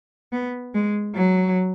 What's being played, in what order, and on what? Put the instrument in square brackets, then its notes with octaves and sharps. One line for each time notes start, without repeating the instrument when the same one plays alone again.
[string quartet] B3
G#3
F#3